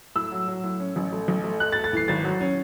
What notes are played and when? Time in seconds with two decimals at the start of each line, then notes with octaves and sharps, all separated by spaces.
0.16 A2 E6
0.32 F#3
0.48 F#3
0.64 A2
0.80 C#4
0.96 A1
1.12 A3
1.28 A1
1.44 A3
1.60 A3 F#6
1.72 A6
1.76 A3
1.84 A6
1.93 E3 C7
2.08 G#1 A6
2.24 F#3
2.41 C#4